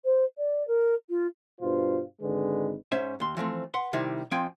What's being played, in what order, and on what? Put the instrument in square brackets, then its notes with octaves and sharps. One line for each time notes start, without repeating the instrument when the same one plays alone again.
[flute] C5
D5
A#4
F4
[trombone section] G2 B2 F4 C5
G#1 D3 G#3 B4
[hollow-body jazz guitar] G#2 C#4 C5 E5
D#2 C6
E3 F3 A3 C4
B4 F#5 C6
C3 D#3 G3 E4
F2 F3 C4 G5 G#5